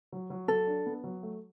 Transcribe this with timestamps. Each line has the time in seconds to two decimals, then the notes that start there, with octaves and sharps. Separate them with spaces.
0.12 F#3
0.30 F#3
0.48 F#3 A4
0.67 D4
0.86 B3
1.04 F#3
1.23 A3